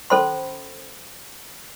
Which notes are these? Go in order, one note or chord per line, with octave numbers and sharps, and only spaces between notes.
C#4 A4 C5 B5 C6